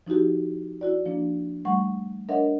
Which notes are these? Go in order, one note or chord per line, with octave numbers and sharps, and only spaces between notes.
F3 D#4 E4 F#4 G4
E4 F#4 D5
F3 A#3 D4
G3 A3 F#5 C#6
D4 A#4 C#5 D#5 E5 F#5